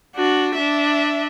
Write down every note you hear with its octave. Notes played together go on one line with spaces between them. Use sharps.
D4 F#4
D4 E5